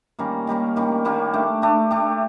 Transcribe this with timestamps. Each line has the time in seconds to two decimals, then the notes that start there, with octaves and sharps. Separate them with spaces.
0.19 D#3 G3 A#3 C#4
0.47 D#3 G3 A#3 C#4
0.76 D#3 G3 A#3 C#4
1.05 D#3 G3 A#3 C#4
1.34 A3 D4 G4
1.62 A3 D4 G4
1.91 A3 D4 G4